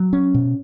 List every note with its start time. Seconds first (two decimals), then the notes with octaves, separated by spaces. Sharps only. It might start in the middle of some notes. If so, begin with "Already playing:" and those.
Already playing: F#3
0.13 C#4
0.34 B2